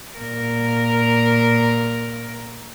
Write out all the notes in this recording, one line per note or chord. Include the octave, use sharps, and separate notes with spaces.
A#2 A#4